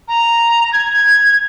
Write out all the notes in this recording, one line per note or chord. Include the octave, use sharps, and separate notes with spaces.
A#5
G#6